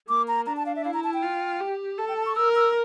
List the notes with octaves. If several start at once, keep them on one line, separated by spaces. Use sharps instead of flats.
A#3 D6
A#5
D4 A#5
A5
F5
E5
E4 F5
A#5
A5
G5
F4
G4
A4 A5
G5
A5
C#6
A#4 E6
E6